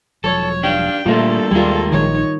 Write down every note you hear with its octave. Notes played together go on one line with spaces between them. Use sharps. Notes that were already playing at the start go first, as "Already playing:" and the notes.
E1 F3 F#3 A4 C#5
D4 G4 F5 G5
A#2 G3 A3 A#3 D4 F4 A4
D#2 G3 G#3 F4 A#4
A#1 D#3 D#4 C#5